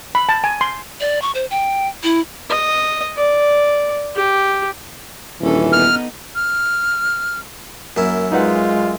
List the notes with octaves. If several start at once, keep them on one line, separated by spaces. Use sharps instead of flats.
B5
A5
G#5
C6
D5
C#6
C5
G5
E4
D#5
D5
G4
D#1 E3 C#4 D4 A4
B3 D#4 F6
F6
F#2 A#3 E4
G#3 D#4 F4 B4 F#5